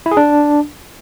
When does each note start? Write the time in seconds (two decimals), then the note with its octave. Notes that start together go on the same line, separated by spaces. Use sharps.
0.06 E4
0.11 G#4
0.17 D4